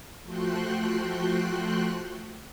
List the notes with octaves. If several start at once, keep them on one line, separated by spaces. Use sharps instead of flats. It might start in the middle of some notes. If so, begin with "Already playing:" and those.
F3 A3 F#4 G5 C6 F#6